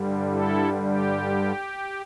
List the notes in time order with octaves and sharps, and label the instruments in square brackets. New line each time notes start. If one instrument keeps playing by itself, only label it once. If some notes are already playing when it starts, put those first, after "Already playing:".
Already playing: [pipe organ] G2 D3 G3
E4 A4
G4